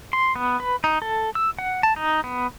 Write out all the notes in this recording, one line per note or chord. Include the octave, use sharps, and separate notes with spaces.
C6
B3
B4
D#4
A4
E6
F#5
A5
D#4
B3